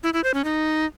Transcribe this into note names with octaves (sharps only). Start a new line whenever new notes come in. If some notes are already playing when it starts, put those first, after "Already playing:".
E4
E4
C5
C#4
D#4